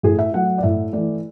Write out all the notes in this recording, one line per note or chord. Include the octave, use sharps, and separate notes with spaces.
A2 G#4
E5
F#3 A3 F#5
D5
A2 E5
E3 A3 D5